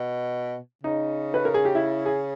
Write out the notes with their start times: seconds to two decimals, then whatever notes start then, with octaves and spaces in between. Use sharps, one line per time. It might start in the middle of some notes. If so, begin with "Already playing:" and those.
Already playing: B2
0.84 C#3 D#4
1.34 B4
1.45 A#4
1.54 G#4
1.65 G4
1.75 E4
2.06 G#4